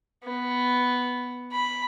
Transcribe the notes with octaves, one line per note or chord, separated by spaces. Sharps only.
B3
B5